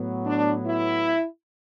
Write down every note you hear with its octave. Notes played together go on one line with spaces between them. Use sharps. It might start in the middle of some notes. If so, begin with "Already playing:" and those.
Already playing: A2 F#3 B3
D4
E4